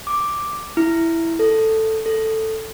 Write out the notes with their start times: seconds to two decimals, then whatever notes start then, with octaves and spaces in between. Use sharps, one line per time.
0.07 D6
0.77 E4
1.39 A4
2.06 A4